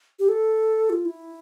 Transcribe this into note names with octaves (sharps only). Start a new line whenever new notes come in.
G4
A4
F4
E4